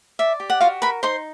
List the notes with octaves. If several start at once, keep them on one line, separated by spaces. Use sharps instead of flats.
D5 E5
G4
F#5
F4 F#4 F5
A#4 B4 B5
D#4 C5 C6